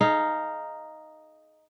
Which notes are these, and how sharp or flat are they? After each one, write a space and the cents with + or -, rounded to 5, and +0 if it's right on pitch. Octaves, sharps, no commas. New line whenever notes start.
D#4 +0 G#4 +40 F5 -10